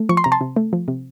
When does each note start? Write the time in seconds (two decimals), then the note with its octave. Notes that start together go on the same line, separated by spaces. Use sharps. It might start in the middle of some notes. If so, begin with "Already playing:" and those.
Already playing: A3
0.09 F3 C#6
0.17 C6
0.24 C3 A#5
0.32 A5 C6
0.41 C3
0.56 A3
0.73 F3
0.88 C3